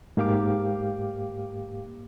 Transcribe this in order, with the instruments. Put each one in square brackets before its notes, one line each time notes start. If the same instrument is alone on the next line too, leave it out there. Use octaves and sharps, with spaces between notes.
[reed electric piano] G#2 A#3 G4 F5 G5 D6